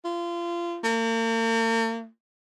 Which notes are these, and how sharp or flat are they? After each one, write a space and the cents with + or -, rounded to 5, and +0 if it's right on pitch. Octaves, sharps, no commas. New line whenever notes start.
F4 -25
A#3 -45